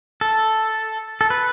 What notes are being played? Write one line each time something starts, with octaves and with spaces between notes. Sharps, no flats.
A4
A4
B4